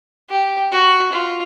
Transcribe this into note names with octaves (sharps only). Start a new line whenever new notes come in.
G4
F#4
F4